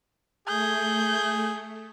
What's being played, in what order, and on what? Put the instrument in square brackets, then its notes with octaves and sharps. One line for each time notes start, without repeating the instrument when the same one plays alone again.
[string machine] A3 [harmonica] G#4 [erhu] G6